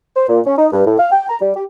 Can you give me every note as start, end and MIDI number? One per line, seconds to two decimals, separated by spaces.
0.16 0.26 72
0.29 0.40 46
0.46 0.57 61
0.58 0.67 63
0.73 0.83 43
0.86 0.98 45
0.99 1.07 77
1.11 1.28 79
1.29 1.37 82
1.41 1.52 55
1.56 1.64 67